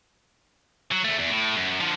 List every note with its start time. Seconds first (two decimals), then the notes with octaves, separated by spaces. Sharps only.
0.92 F#3
1.04 E2 A3
1.19 E2
1.30 A2
1.56 F#2
1.80 D3 F3